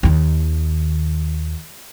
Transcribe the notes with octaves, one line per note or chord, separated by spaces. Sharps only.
D#2 D#3